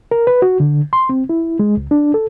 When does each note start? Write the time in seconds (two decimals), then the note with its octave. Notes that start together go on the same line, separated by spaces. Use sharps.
0.11 A#4
0.27 B4
0.42 F#4
0.60 D3
0.93 C6
1.09 C4
1.29 E4
1.59 G#3
1.77 C#2
1.91 D4
2.14 A4